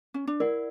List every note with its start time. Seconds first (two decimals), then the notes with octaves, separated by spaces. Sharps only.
0.14 C#4
0.27 D4
0.40 E4 A#4 D5 F#5